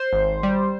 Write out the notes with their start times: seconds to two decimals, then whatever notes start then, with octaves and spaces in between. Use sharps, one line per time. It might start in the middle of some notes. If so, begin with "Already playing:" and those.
Already playing: C5
0.13 G#1
0.43 G3